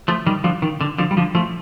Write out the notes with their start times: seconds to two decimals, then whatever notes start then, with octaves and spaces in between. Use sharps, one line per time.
0.08 F3 A3
0.26 D#3 G3
0.44 D3 F3
0.62 D#3
0.81 D3
0.98 D3 F3
1.11 G3
1.17 D3 F3
1.35 F3 A3